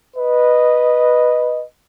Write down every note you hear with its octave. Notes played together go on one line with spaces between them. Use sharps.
B4 D#5